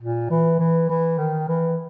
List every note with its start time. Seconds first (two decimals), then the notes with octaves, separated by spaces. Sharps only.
0.01 A#2
0.30 E3
0.59 E3
0.89 E3
1.18 D#3
1.48 E3